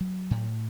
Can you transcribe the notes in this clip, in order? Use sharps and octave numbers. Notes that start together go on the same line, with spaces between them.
F#3
A2